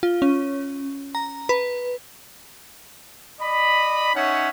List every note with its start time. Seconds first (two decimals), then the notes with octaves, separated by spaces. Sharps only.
0.03 F4
0.22 C#4
1.15 A#5
1.49 B4
3.41 D5 D#5 B5
4.15 C#4 D#4 C#5 E5 F#5